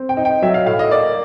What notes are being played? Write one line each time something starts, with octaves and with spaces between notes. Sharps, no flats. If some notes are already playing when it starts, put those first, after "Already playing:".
Already playing: C4
G5
D#4
G5
F#3 E5
F5
A2 F5
D#5
A#3 D5